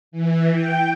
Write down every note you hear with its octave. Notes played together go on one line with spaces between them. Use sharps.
E3
G5